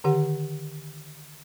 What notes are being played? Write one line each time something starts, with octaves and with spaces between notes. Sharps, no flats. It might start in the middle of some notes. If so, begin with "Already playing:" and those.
D3 D#3 G4 F#5